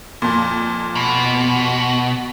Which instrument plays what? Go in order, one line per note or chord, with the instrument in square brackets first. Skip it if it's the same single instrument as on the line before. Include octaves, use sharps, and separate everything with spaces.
[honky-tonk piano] F2 A#2
[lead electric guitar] B2